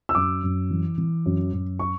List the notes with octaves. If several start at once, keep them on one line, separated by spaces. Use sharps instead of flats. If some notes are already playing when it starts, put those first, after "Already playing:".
E6
F#2 D6
F#2
E3
E3
F#2
F#2
C#6